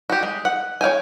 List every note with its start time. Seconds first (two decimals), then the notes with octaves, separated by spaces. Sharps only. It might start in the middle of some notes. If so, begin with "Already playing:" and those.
0.10 F#4 G4
0.23 G#3
0.45 F#5
0.81 C#5 F5 G5 G#5